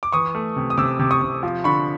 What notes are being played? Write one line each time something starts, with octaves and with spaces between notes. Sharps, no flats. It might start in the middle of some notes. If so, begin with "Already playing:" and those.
D6
E3 C#6 D#6
A3
C3
D#6
C3 D6 E6
C3
C#6 D#6
C3
F3
D3 B5 C#6